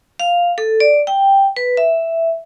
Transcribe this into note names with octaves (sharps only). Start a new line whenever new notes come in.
F5
A4
D5
G5
B4
E5